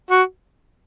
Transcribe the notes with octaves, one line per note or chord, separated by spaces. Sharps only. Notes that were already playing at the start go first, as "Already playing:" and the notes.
F#4